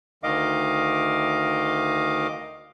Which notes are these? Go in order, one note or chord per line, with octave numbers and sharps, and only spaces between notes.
D2 D#3 D#5 F5 D6